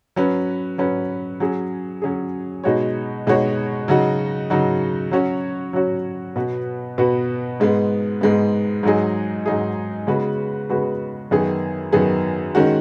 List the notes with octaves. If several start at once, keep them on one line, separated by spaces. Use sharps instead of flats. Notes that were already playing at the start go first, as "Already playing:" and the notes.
F#3 C#4 B4
F#3 C#4 B4
F#3 C#4 G#4
F#3 C#4 G#4
B2 G#3 D#4 F#4 C#5
B2 G#3 D#4 F#4 C#5
C#3 F#3 D#4 F#4
C#3 F#3 D#4 F#4
F#3 C#4 F#4 C#5
F#3 C#4 F#4 C#5
B2 B3 F#4 B4
B2 B3 F#4 B4
G#2 G#3 B3
G#2 G#3 B3
G#2 F#3 D#4 G#4
G#2 F#3 D#4 G#4
C#3 G#3 B3 F#4 B4
C#3 G#3 B3 F#4 B4
F#2 D#3 B3 G#4
F#2 D#3 B3 G#4
D#3 G#3 C#4 F#4